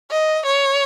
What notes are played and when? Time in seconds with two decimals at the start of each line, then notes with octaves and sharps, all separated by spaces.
0.11 D#5
0.46 C#5